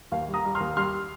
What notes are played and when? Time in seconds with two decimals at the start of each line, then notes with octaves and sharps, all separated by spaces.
0.12 D#2 F5
0.28 G3
0.34 A#5 D#6
0.45 G3
0.55 C6 F6
0.60 D#2
0.76 G3 C6 F6